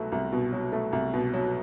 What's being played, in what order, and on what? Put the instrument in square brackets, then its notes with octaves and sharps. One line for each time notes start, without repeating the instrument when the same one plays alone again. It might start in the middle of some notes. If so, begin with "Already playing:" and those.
Already playing: [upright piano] C2 B2 F#3 A3
C2
B2
F#3
A3
C2
B2
F#3